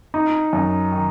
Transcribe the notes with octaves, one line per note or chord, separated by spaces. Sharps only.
D#4
F#2
D#3